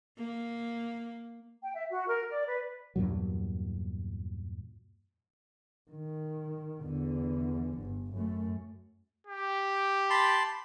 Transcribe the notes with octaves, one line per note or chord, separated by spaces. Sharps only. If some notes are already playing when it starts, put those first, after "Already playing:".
A#3
G5
E5
F#4
A#4
D5
B4
E2 G2 A#2 F#3
D#3
E2 D3
G1
F#2 A3
G4
A5 B5 C6